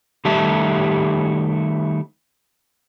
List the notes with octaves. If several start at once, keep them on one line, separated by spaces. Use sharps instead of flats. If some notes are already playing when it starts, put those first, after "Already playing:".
D#3 G3 A3 G4 E5 A5